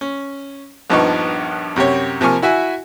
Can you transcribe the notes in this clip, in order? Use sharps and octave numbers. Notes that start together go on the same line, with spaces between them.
C#4
A#1 G2 F3 B3 D#4 C#6
F#2 C3 G4 C#5
C3 F3 A#3 G#5 C#6 F6
E4 F#4 E5 G#5